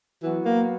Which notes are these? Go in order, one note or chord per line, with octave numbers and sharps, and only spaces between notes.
E3 F#3 B3 F#4
A#3